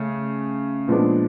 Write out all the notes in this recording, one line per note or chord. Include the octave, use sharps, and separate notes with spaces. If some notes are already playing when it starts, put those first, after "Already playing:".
Already playing: C#3 A3
A#2 F3 G#3 B3 D4